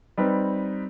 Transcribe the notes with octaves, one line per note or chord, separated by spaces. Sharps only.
G3 C4 D#4 B4